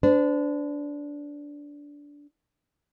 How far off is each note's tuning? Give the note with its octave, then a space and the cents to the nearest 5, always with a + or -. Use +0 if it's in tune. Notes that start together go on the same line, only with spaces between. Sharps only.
D4 -15 C5 -45